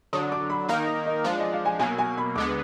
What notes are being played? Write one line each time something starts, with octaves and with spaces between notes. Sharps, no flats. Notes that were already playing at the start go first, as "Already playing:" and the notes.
D3 F#3 D4 D#6
D6
B5
D#3 A#3 D#4 A#4 F5
D#5
D#5
F3 G#3 D4 F5
D#5
F5
G#5
B2 F#3 A#3 G#5
G#5
B5
D2 D3 G#3 B3 D6